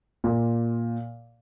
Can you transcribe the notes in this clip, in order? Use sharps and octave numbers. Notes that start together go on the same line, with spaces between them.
A#2